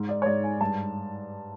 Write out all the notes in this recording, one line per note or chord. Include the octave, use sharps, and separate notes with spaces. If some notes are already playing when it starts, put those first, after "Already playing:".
Already playing: G#2
D5
C#5
G#2 D5
G#5
G2 A5